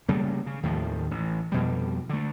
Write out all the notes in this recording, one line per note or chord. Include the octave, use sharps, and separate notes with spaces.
C#3 G3 A3 A#3
C#3
D#2 A2 D#3 F3
A1
F2 B2 G3
D3 A3